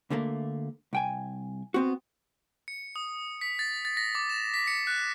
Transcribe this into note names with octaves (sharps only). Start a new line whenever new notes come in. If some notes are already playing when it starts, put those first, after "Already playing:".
D2 D3 A3 A#3
C2 G5 G#5
B3 C4 F#4
C#7
D#6
B6
A6
A6
A#6
D6
E7
B6
C#7
F#6